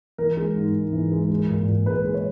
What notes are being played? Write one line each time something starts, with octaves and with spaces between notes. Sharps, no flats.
E3 A#4
G#3
G#2
G#2
E3
G#3
G#3
A#2
A#2
G#3 B4
G#3
C#5